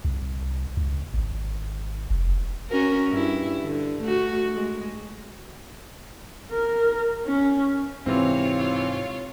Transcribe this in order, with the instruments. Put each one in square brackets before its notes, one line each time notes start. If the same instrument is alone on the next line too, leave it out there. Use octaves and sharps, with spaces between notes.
[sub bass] C2
C#2
G#1
F1
[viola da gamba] C#4 F#4 A#4
G2 E4
D3
A3 F#4
G#3
[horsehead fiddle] A#4
C#4
[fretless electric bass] G#2 C3 [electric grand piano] E3 C4 [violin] F4 C#5